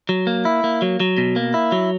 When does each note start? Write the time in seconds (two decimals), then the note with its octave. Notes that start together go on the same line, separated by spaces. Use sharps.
0.09 F#3
0.27 A#3
0.45 E4
0.64 A#3
0.82 F#3
1.00 F#3
1.18 B2
1.36 A#3
1.54 E4
1.72 F#3